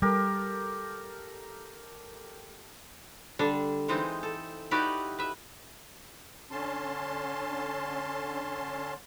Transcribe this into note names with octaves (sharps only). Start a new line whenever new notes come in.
G3 G4 A4 A#4
D3 G3 D4 A4
E3 G#3 C4 D#4
A4
D#4 E4 F#4 G4 B4 D5
B4 E5
D3 C#4 A5 C6